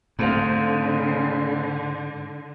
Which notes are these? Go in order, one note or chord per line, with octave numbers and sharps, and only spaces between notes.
G#2 D3 A3 C4 F5